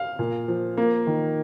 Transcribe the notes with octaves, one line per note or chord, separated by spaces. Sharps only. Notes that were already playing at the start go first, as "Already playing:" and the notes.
Already playing: F5
A#2
F3
A#3
D#3